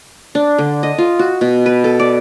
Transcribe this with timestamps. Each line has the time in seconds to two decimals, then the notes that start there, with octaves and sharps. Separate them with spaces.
0.35 D4
0.58 D3
0.83 D#5
0.98 F4
1.19 F#4
1.41 B2
1.66 B4
1.84 A4
2.00 D5